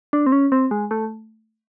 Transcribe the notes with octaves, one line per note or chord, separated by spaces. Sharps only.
D4
C4
C#4
C4
G#3
A3